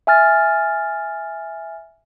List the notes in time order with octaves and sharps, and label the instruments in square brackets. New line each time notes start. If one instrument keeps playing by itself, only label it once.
[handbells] E5 G#5 F6 A6